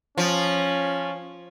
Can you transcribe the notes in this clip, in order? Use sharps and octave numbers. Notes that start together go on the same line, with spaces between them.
F3 C#4